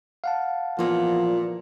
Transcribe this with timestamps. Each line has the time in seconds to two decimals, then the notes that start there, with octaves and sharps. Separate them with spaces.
0.24 F5 F#5 A5
0.79 E2 A#2 F3 F4